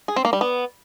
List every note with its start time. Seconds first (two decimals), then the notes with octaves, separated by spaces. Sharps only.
0.08 G#4
0.16 C4
0.25 A#3
0.33 G3
0.41 B3